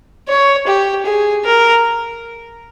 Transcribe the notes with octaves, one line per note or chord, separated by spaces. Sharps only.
C#5
G4
G#4
A#4